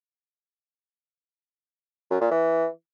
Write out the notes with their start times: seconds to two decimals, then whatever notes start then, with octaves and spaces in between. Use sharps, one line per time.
2.10 F#2
2.21 A#2
2.31 E3